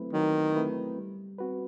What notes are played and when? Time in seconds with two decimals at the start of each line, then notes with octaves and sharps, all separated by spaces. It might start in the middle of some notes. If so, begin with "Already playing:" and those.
Already playing: F#3 A3 C4 E4 B4
0.13 D#3 F#3
0.56 A3 C4 E4 B4
0.97 G3
1.39 C4 F#4 B4